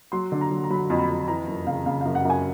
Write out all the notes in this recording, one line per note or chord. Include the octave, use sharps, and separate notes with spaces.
F#3 C6
D3
A#5
F#3
A#5
F#3 B5
F2
B5
F2
E3 A#5
F#2
C#3 F5
C#3 F5
F#2 F5
F#5
F#2 G#5